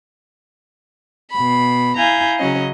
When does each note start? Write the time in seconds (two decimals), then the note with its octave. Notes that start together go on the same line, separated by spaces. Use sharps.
1.32 B2 B5
1.98 E4 F5 G#5 A#5 G6
2.38 C#3 F#3 C#4 D#5